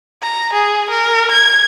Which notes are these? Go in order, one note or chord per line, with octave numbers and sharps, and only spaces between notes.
A#5
G#4
A#4
G#6